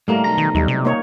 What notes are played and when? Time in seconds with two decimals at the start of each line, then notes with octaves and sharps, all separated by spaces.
0.08 A2 G3 A3 A#3 A#4
0.24 B1 A#5
0.38 D#3
0.55 D#2 G3 D#4
0.68 C3
0.85 A#3 D#4 C#5